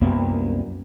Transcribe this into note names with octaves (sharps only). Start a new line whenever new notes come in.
C2 F#2 A#3 B3